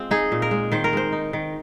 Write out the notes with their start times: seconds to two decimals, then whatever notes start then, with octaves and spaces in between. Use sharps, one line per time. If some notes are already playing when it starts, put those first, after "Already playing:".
Already playing: G#3 C4 F4
0.11 D#4 G#4
0.32 A#2
0.42 A#4
0.51 G#3
0.72 D#3 C5
0.84 A#4
0.93 G#3 C5
1.12 D#4
1.33 D#3